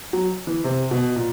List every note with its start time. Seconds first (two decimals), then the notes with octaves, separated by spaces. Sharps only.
0.13 F#3
0.47 E3
0.64 C3
0.91 B2
1.16 A#2